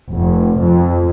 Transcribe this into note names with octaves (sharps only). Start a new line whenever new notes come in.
F1
F2